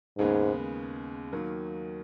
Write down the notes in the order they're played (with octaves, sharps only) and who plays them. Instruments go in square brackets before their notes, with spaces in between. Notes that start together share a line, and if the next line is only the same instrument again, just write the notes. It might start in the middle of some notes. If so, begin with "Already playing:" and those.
[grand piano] D#2 C#3 G#3 B3 [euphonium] G#2
[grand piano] D#2 D#3 F#3 A#3